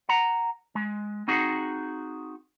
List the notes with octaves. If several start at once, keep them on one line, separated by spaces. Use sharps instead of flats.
F#5 A#5
G#3
C4 D#4 F#4 G#4